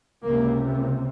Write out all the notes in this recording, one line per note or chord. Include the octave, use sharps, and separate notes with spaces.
C#2 C3 A#3